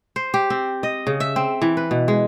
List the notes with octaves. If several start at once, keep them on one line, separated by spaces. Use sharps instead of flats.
C5
G4
C4
D#5
C#3
E5
C4
E3
B4
B2
G#3